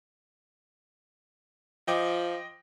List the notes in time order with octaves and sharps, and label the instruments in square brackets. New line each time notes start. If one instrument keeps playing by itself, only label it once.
[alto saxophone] F3 [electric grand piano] D#5 G5 D6